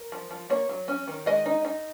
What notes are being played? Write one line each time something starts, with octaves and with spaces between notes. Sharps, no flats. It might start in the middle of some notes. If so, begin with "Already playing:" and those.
Already playing: A#4
F3
F3
A#3 C#5
F#3
C#4
D#3
G#3 D#5
D#4
D#4